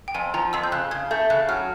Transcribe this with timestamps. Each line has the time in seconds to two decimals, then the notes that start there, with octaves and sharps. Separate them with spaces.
0.08 G5
0.15 F2 G#5
0.34 F3 A#5
0.53 F2 E6
0.64 G6
0.72 C#3 F#6
0.91 C#3 G#6
1.11 A3 G6
1.30 C#3 F#6
1.49 F#3 F6